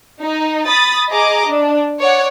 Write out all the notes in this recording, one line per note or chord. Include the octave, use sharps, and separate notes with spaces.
D#4
B5 D#6 A6
G#4 D#5 A#5 D6
D4
C#5 D5 F#5